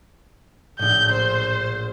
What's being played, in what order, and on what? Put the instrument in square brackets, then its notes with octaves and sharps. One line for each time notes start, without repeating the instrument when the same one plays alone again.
[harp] A#1 A2 [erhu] G6
[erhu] C5